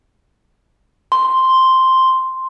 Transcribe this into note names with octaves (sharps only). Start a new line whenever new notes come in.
C6